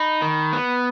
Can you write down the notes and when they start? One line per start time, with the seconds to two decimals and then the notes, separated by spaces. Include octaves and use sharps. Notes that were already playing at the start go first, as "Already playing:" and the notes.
Already playing: D#4 B5
0.22 D#3
0.53 B3